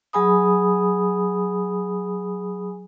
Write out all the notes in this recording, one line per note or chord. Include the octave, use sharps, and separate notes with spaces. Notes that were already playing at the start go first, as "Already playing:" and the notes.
F#3 G#4 G#5 B5 D#6